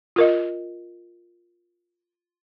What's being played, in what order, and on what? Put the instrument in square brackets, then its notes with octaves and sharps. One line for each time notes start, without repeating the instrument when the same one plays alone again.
[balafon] F4 A#4 D#5